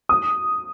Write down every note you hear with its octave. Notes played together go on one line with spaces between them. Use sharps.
D#6